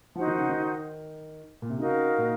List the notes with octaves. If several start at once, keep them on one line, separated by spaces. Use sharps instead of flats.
F3 D#4 F#4 C5 F#5
D#3
C#3
D#3
A#2
C3
C#3 D#4 F#4 A#4 F5
A#2